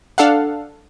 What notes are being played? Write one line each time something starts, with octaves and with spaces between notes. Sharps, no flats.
D4 A4 F5 F#5